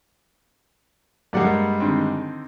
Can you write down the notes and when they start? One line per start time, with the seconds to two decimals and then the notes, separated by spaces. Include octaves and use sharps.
1.33 G2 G3 G#3 A#3 D5 F#5
1.80 D3 D#3 C4